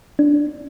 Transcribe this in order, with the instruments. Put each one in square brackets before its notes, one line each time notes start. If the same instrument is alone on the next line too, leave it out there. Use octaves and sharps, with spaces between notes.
[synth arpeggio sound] D4